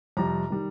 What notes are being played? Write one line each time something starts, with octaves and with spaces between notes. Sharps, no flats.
F2 C3 G3 A#5
D#3 G3